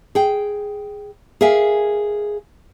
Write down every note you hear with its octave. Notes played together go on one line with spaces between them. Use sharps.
G#4 G5
G#4 A#4 E5 F5 G#5